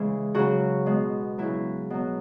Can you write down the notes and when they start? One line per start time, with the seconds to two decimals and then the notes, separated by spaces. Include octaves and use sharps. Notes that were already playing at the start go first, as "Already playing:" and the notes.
Already playing: C#3 E3 G#3
0.35 C#3 F#3 F#4
0.86 B2 G#3
1.38 C#3 F#3 E4
1.90 B2 F#3